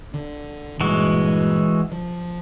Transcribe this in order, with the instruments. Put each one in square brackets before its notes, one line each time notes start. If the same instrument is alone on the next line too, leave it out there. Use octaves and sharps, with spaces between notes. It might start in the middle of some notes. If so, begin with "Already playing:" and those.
[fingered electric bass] D3
[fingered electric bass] G2 A#2 [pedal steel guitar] E3 G#3 F#4
[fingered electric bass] F3